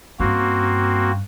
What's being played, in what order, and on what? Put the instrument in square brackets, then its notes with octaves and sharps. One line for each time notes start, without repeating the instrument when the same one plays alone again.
[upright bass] G2 C#4 [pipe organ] A#3 C4 F#4